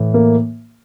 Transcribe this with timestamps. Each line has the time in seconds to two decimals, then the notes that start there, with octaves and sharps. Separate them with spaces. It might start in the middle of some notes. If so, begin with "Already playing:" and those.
Already playing: A2 E3
0.14 A#3